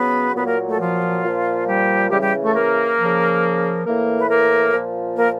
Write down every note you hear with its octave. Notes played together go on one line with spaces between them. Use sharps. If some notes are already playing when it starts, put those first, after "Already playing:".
Already playing: C#3 F#3 B3 B4
A#2 F#3 B3 B4
A#3 A#4
A3 A4
F3 F4
A#2 F3
G3 G4
C#3 E3 G3 G4
G3 G4
A3 A4
A#3 A#4
C#3 F3
A2 E3 A#3 A#4
B4
A#3 A#4
A#2 F3
A#3 A#4